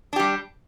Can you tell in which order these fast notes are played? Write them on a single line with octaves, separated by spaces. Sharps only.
D4 G4 G3